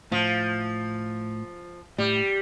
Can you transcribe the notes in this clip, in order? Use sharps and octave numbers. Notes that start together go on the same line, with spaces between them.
A2 F3
A2 G3